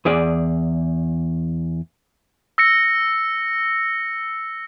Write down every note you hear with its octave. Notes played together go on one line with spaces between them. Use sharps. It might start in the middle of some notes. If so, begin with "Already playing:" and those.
E2 G#4 D5
E6 A#6 C#7